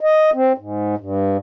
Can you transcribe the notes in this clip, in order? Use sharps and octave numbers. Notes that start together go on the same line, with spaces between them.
D#5
C4
G#2
G2